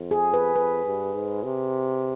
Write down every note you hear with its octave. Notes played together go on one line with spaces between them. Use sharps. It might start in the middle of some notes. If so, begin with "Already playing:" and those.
Already playing: F2
G#4
B4
F2 B4
G2
G#2
C3